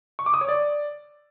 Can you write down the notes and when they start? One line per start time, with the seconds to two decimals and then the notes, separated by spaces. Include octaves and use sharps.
0.19 C#6
0.26 D6
0.34 D#6
0.41 C#5
0.49 D5